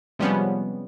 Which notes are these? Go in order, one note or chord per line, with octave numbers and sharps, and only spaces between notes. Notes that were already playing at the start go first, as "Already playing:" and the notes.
C3 F3 G3 G#3 B3 C#4